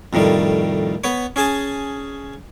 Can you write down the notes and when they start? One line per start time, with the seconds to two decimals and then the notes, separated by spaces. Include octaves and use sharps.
0.13 F2 A2 D#3 G3
1.04 B3 B4 C#5
1.36 C#4 G#4 G#5 A5 D#6